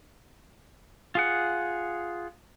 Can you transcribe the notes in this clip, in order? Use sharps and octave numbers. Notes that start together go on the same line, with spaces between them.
F4 G#4 F#5